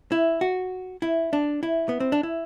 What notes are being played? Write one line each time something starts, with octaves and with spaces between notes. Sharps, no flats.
E4
F#4
E4
D4
E4
B3
C4
D4
E4